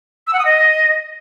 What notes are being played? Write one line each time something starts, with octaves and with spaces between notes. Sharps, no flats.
E6
F#5
D#6
D#5